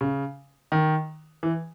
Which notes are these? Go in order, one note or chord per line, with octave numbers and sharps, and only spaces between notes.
C#3
D#3
E3